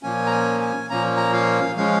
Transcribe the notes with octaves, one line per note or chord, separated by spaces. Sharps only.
A#2 F3 A#3 C#4 G#5
A#5
G#5
G#5
A#2 F3 A#3 C#4 A#5
A#5
F5
F3 G#3 C#4 F5